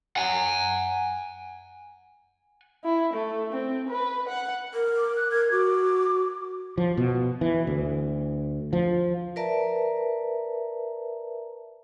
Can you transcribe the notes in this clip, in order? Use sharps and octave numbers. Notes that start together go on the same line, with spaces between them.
F#5 G#5
E4
A3
C4
B4
F#5
A#4
D6
F#6
A#4 G#6
F#4 D6
F3
B2
E3
D2
F3
A#4 B4 D5 E5 A5 A#5